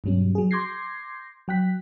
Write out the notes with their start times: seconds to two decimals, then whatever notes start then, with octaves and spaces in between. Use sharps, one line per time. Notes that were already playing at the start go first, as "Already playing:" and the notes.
0.04 G2 B2 F#3 G3 C#4
0.35 F#3 G#4
0.51 C6 D6 G6 G#6 A#6 C7
1.48 F#3 G5 F#6 B6